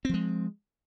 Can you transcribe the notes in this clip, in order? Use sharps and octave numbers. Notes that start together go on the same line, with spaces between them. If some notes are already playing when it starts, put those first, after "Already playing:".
F3 G#3 C4